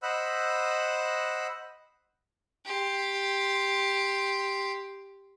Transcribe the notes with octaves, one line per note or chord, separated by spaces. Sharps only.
C5 D#5 F#5 B5 E6 F#6
G4 C6